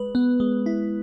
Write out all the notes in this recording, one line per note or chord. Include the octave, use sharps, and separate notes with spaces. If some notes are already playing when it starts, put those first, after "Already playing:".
Already playing: G#3 B4
B3
G#3
E4